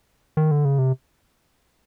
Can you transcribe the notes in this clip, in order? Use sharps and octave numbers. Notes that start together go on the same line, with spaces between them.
D#3
D3
C#3
C3